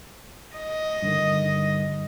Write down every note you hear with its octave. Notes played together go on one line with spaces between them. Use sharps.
D#5
G2 D3 D#3